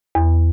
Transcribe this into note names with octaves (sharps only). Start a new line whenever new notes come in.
E2